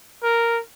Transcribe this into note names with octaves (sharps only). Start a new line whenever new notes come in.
A#4